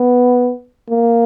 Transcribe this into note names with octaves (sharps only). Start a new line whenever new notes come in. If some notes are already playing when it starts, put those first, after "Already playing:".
Already playing: B3
A#3